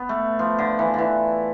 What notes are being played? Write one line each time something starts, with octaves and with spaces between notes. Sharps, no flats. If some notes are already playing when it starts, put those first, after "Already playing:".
Already playing: B3
A3
F3
D3
E3
D3 E3